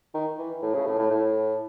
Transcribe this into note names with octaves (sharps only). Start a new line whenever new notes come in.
D#3
E3
A2
C#3
A2
A2
A2